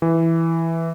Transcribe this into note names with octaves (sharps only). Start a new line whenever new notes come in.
E3